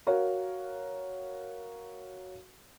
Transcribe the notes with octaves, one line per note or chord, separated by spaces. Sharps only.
F#4 A#4 C#5 F5